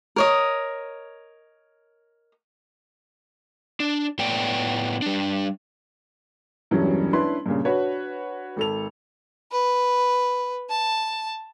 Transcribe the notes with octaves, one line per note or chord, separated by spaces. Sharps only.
A#4 C#5 D#5
D4
A2 A3 B3 D5 G5
G3 D4
E1 G2 E3 F#3 G3 C#4
C#4 D4 E4 B4 C6
G2 A#2 C#3
D4 F#4 B4 C#5
G#1 A4 F7
B4
A5